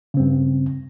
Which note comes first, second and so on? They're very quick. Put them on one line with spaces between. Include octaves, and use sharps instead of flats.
C#3 C4 G2